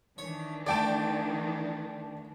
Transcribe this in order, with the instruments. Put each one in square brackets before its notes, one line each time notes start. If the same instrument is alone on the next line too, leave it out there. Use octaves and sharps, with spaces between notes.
[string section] D#3 E3 D4 [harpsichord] C#5
[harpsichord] D3 A3 [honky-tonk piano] D5 G5 A5